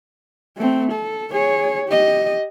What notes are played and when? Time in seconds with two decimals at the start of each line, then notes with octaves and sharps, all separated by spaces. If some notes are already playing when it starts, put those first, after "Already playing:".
0.57 A3 C4
0.92 A4
1.32 G#4 C#5
1.89 G4 D#5